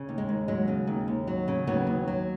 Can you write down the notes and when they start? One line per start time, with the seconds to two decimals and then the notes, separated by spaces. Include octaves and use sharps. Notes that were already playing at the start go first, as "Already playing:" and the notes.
Already playing: C#3
0.09 D#2
0.18 G#3
0.29 D#2
0.48 F#3 G#3
0.68 C#3
0.87 D#2
1.08 D#2
1.27 F#3
1.48 C#3
1.67 D#2 F#3 B3
1.87 D#2
2.08 F#3